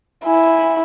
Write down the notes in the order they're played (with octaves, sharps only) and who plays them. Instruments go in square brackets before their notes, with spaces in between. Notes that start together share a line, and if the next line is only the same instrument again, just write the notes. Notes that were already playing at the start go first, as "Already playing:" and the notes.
[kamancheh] E4 [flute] G#5